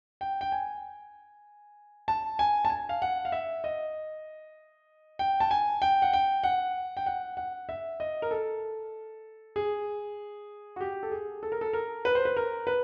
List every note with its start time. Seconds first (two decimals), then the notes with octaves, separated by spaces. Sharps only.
0.21 G5
0.41 G5
0.52 G#5
2.08 A5
2.39 G#5
2.65 A5
2.70 G#5
2.89 F5
3.02 F#5
3.25 F5
3.32 E5
3.64 D#5
5.19 G5
5.40 A5
5.51 G#5
5.82 G5
6.02 F#5
6.13 G5
6.44 F#5
6.97 G5
7.06 F#5
7.37 F#5
7.69 E5
8.00 D#5
8.22 A#4
8.31 A4
9.56 G#4
10.76 F#4
10.81 G4
11.03 A4
11.12 G#4
11.43 A4
11.52 A#4
11.61 A4
11.73 A#4
12.05 B4
12.15 C5
12.25 B4
12.37 A#4
12.67 B4